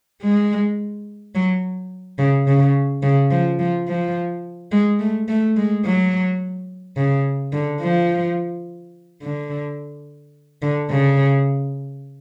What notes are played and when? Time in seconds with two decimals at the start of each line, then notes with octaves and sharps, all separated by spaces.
0.22 G#3
1.35 F#3
2.19 C#3
2.47 C#3
3.03 C#3
3.31 F3
3.59 F3
3.88 F3
4.72 G#3
4.99 A3
5.28 A3
5.56 G#3
5.85 F#3
6.97 C#3
7.53 D3
7.81 F3
9.22 D3
10.62 D3
10.90 C#3